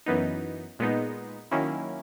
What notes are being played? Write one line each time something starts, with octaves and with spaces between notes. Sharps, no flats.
F#2 E3 B3 D#4
A#2 G#3 B3 D#4
D#3 F#3 A#3 C#4 E4